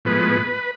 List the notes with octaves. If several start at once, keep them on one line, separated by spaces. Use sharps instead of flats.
A2 F3 G#3 B3 B4